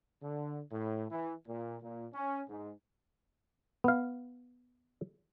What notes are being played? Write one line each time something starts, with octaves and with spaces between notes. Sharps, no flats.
D3
A2
E3
A#2
A#2
C#4
G#2
B3 F5